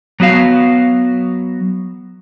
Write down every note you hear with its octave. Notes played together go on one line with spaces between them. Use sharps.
F#3 B3 F#4 F5